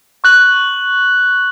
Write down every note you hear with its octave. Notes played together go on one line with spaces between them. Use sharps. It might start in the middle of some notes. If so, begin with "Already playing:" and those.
C#6 F#6 F#7